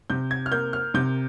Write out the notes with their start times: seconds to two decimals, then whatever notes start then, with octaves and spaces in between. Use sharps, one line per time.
0.10 C3 G6
0.31 G#6
0.46 F6
0.52 A#3 G6
0.73 F6
0.94 C3 G6